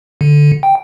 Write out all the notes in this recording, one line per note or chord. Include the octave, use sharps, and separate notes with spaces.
D3
G5